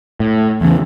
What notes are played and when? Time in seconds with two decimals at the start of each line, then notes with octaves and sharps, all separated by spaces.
0.20 A2
0.61 E2 C#3 E3